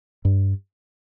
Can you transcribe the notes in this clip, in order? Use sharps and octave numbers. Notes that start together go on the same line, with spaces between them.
G2